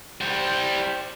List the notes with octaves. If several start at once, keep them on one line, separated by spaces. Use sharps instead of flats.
G3 C5